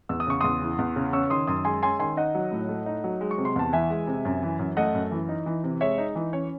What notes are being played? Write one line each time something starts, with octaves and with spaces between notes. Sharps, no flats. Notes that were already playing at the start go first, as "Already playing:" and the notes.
E2 E6
D#6
C#3 C#6
E2 C6 D#6
E3
E2
C#3
C#4 C#6 E6
D#3 C6 D#6
F#2 C6 D#6
G#3 G#5 C6
C#4 G#5 C6
D#3 G#5 C6
D#4 D#5 F#5
F#3
A2
A3
D#4
F#3
G#3
C#6
C3
C6
E2 A5
E3 E5 G#5
G#3
C3
F#2
E3
F#2
A3 D#5 F#5
F#2
E3
D#4
E3
C3
G#3 C#5 E5
D#4
E3
C#4 C#5